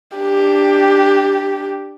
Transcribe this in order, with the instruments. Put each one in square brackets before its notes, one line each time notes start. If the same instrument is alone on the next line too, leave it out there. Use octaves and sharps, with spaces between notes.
[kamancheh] D4 G4